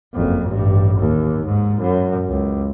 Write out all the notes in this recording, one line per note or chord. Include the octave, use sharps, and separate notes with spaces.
F#1 F2
A1 G2
D#2
G#2
F#2
C#2